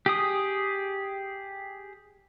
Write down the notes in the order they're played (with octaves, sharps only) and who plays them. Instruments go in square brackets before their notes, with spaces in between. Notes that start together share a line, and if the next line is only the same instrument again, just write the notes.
[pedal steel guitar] G4 G#4 D#6